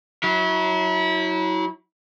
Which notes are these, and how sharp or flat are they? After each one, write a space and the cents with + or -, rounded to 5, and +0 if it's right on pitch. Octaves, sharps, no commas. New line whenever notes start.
F#3 +0 E4 -30